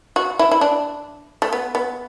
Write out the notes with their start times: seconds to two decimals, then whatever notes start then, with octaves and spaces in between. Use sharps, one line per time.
0.16 F#4
0.39 E4
0.51 E4
0.61 D4
1.42 A3
1.53 B3
1.75 B3